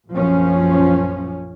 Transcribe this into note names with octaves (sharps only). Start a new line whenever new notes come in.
A#1 F#2 F3 C#4